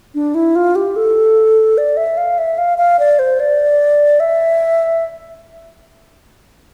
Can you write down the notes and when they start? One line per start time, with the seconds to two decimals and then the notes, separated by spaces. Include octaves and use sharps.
0.15 D4
0.35 E4
0.56 F4
0.75 G4
0.96 A4
1.78 D5
1.97 E5
2.17 F5
2.38 E5
2.58 F5
2.78 F5
2.99 D5
3.19 C5
3.40 D5
4.20 E5